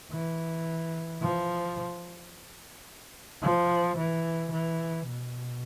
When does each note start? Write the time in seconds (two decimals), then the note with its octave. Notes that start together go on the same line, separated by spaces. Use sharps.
0.12 E3
1.22 F3
3.42 F3
3.98 E3
4.52 E3
5.08 B2